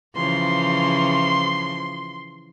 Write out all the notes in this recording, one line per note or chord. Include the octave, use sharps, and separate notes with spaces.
C#3 E3 F3 C6